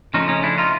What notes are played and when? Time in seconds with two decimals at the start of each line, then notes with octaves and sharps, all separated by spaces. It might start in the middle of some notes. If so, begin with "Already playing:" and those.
0.14 C#3 F3 A3 C#4 D#4
0.28 C#4 D#4
0.43 D4 E4
0.58 D#4 F4